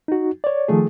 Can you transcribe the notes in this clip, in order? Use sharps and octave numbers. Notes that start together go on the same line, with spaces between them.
D#4 F#4
C#5 D5
D#3 F3 A3 G#4